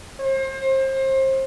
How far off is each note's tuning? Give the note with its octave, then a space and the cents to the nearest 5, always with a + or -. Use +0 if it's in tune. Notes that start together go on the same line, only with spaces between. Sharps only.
C5 +30